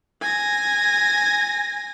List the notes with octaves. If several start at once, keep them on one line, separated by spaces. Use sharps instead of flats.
G#5 A#6